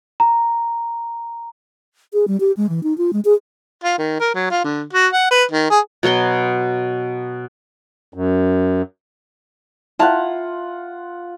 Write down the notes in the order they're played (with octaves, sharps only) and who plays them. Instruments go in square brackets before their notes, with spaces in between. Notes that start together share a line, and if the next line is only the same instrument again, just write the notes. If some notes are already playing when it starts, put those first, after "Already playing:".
[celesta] A#5
[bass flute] G#4
G3
G4
G#3
E3
D#4
F4
G#3
G#4
[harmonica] F4
D#3
A#4
F#3
F4
D3
F#4
F#5
B4
D#3
G#4
[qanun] B2 F#3 B3 C6
[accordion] F#2
[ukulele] E4 A5 A#5 [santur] F4 F#5